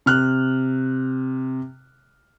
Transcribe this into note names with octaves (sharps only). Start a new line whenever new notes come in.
C3 F6 F#6